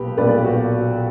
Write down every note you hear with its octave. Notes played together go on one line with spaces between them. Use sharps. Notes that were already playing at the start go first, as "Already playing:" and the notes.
Already playing: B1 A#2 G4 B4
B1 A#2 B4 D5
F#4